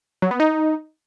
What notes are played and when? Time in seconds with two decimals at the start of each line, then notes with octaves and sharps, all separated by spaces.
0.22 F#3
0.31 B3
0.40 D#4